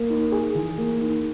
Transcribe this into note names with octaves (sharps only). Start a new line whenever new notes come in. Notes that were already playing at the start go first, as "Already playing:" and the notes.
Already playing: A#3
D#4
G#4
E3
A#3
D#4